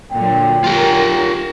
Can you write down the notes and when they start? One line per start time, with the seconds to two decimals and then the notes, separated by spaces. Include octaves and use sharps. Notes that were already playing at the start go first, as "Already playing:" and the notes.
0.12 A#2 D3 F#3 G5
0.64 D3 F#3 F4 G4 A#4